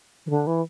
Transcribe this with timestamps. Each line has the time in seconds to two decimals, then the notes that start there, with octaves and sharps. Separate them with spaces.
0.26 E3
0.30 D3
0.47 E3